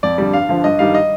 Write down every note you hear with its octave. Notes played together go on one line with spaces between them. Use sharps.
F2 D5
D3 G3
G2 F5
D3 F3
G2 D#5
D#3 G3 F5
D#5